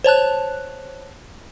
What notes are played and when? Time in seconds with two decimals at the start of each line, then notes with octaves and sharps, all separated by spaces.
0.04 C5 C#5 A5 F#6